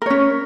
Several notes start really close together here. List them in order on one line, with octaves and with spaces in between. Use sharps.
A#4 C#5 C#4